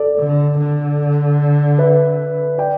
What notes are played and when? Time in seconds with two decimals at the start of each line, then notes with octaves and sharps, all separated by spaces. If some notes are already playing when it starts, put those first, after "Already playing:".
Already playing: A4 D5
0.19 D3
0.59 D3
1.79 B4 E5
2.58 D5 G5